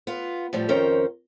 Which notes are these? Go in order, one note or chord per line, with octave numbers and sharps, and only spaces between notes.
B3 F4
A2 F3 G3
F2 D#3 C#4 A#4 C5 G5